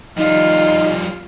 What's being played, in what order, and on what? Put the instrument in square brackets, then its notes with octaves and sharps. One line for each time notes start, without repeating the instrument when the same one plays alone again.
[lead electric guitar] F3 G3 [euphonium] D#4 [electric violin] F4